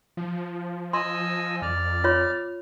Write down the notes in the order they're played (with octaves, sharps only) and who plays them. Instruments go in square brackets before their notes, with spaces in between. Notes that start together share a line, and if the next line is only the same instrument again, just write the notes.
[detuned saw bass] F3
[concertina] D#5 G#5 E6 [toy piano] C6
[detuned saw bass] F2 [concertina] D5 F6
[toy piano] F4 C#5 C6